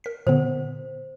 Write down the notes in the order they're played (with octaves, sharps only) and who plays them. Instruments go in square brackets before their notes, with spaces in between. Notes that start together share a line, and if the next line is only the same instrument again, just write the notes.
[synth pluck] A#4 B6
[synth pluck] A#2 D3 B3 [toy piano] C5